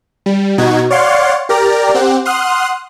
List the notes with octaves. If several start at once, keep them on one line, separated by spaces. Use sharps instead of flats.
G3
B2 D#4 F#4 G#6
C#5 D5 F5 F#5 C6
G4 A#4 D5 A#5
C4 G4 F#5
F#5 C6 D#6 F6 F#6